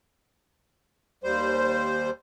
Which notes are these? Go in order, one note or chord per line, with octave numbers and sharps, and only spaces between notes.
D#2 G3 C5